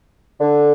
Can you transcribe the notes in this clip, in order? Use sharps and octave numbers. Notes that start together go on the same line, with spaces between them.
D3